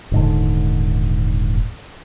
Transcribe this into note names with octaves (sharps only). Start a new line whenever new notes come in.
D#1 G#2 D3